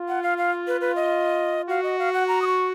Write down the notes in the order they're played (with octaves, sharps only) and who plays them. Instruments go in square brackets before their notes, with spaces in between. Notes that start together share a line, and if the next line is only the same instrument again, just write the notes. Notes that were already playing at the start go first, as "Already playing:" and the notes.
Already playing: [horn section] F4
[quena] F#5
F5
F5
B4
B4
D#5
[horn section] F#4 [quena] F5
[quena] D#5
F5
F#5
A#5
D#6
C#6